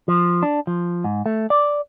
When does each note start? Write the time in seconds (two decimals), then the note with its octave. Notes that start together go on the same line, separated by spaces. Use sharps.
0.08 F3
0.43 D4
0.67 F3
1.04 G#2
1.26 A3
1.50 D5